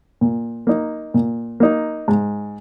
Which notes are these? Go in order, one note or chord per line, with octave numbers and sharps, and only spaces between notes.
A#2
A#3 D#4
A#2
A#3 D#4
G#2